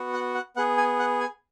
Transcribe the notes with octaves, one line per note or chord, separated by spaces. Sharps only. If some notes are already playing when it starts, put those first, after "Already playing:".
Already playing: B3 F#4
F#5
F#5
B3 G#4 F#5
G#5
F#5
G#5